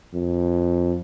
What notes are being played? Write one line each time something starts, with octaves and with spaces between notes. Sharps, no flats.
F2